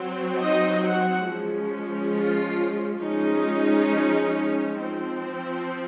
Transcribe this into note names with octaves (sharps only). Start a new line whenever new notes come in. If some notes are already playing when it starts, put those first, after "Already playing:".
Already playing: F#3 C4
D#4 D#5
F#4 F#5
F3 G#3 C#4
F4
F3 G#3 C#4 D#4
F3 C4